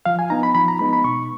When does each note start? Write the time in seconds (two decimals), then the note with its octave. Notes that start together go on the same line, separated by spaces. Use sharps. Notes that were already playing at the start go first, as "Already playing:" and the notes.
0.06 F3 F5
0.19 G#5
0.30 B3 D#4 A#5
0.43 B5
0.55 F3 B5
0.68 A#5
0.79 G#3 B3 D#4 B5
0.93 B5
1.04 B2 C#6